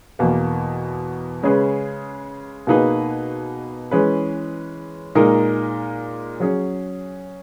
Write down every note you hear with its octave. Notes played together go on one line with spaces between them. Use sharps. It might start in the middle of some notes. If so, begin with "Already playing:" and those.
E2 B2 A#3
C#3 G#3 C#4 G#4 B4
B2 A#3 D#4 G#4 B4
E3 G#3 C#4 G#4 B4
A#2 G#3 D#4 A#4
F#3 C#4 G#4